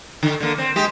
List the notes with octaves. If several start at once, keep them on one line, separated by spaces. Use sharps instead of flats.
D3
D3 A#3
C4
G#3 G4